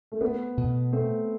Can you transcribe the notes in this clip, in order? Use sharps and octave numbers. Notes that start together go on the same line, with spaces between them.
A3
B3 C4
B2
A3 C4